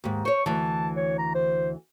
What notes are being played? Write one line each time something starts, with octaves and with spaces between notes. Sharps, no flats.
D#2 G#2
C5 C#5 C#6
D2 E3 A5
C#5
A#5
C5